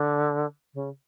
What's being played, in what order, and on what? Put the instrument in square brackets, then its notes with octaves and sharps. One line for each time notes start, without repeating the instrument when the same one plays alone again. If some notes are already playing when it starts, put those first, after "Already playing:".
Already playing: [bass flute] D3
C#3